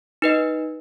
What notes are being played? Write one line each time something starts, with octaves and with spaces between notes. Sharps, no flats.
D#4 B4 D#5